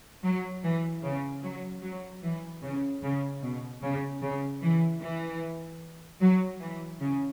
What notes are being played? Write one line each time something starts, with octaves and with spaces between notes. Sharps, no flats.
F#3
E3
C#3
F#3
F#3
E3
C#3
C#3
B2
C#3
C#3
E3
E3
F#3
E3
C#3